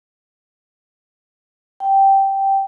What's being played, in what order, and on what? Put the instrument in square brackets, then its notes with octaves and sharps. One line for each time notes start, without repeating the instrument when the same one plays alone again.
[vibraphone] G5